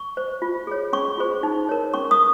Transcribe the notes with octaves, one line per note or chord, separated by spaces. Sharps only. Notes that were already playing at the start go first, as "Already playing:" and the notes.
Already playing: C#6
C5
F4
G#4 C#5
C#4 C#6
F4 G#4 C5
D#4
A#4 C#5
C#4 C#6
D#6